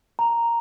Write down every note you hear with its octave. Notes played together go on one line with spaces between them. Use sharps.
A#5